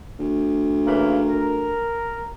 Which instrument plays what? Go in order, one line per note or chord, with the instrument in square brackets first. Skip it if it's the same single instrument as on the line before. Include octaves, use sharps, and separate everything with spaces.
[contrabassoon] D2
[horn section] C#3 E3 A#3
A#4